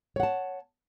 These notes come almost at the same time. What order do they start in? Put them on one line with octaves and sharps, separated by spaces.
C#5 F#5 A5